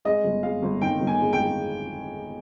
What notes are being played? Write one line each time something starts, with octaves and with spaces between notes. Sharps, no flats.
G#3 D#5
G1
G#3 F5
G1
D#3 G5
G1
G#5
G#3
G5
G#3